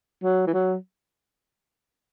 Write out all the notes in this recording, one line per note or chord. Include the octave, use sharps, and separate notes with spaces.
F#3
E3
F#3